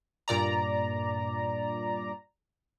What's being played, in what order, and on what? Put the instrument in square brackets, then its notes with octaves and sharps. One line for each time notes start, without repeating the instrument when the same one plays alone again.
[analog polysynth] G2 A#2 D5 A#5